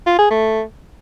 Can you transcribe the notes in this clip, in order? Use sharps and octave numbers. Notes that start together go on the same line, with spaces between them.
F4
G#4
A3